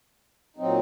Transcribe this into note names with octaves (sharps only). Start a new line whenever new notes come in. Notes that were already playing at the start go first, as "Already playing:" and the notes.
A#2 F#3 C4 D#4